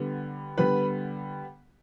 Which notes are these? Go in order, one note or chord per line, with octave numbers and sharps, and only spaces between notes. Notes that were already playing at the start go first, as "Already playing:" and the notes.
Already playing: D3 G3 B3
D3 G3 B3 B4 B5